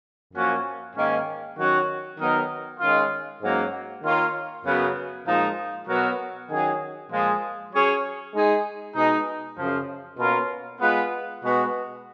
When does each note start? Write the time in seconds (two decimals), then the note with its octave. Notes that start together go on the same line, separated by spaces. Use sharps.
0.34 F#2 F3 A#3 C#4 F#4
0.96 G#2 D#3 A#3 C#4
1.58 D#3 F#3 C#4 F#4
2.18 D#3 F#3 B3 D#4 A#4
2.80 D#3 G#3 C#4 F4
3.42 G#2 F#3 A#3 C#4
4.03 D#3 A#3 F4 A#4 C#5
4.65 F#2 C#3 F#3 B3
5.26 A#2 F3 G#3 D#4
5.88 B2 F#3 B3 F#4 A#4
6.50 D#3 F#3 C#4 G#4
7.11 A#2 F3 G#3
7.73 F#3 C#4 G#4 C#5
8.34 G#3 D#4 G#4
8.95 B2 G#3 D#4
9.56 F#2 C#3 F3
10.19 B2 A#3 C#4 F4 A#4
10.80 G#3 B3 F4 B4
11.42 B2 G#3 B3 F#4